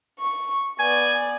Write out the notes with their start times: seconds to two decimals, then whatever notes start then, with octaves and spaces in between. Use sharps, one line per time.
0.19 C#6
0.80 B3 D5 G#5